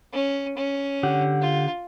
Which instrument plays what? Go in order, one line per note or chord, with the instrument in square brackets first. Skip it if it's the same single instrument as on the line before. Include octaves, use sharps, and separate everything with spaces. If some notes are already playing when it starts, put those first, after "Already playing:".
[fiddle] C#4
C#4
[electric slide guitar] D3 G4 F#5
[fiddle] F4